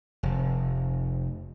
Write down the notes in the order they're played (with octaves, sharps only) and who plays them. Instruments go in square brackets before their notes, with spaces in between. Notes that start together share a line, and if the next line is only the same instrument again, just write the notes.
[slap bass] F1